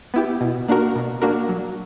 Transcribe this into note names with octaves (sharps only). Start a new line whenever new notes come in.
B3 E4 G4
B2
A#3 D4 F#4 A#4
B2
A#3 D4 F#4 A#4
F#3